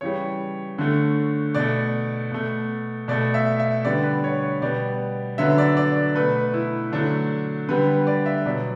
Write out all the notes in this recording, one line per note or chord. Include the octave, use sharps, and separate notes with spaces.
C#3 E3 G3 C#5
D3 A3
B2 A3 D5
B2 A3
B2 A3 D5
E5
E5
D3 G3 B3 D5
B4
C#5
C#5
B2 G3 B3 D5
D3 F#3 B3 E5
D5
D5
D5
B2 A3 B4
E4
D3 F#3 A3 D4
D3 G3 B3 B4
D5
E5
B2 F#3 B3 D5